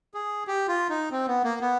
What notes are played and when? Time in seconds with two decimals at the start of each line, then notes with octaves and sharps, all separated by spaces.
0.14 G#4
0.47 G4
0.68 F4
0.90 D#4
1.11 C4
1.28 B3
1.44 A#3
1.61 B3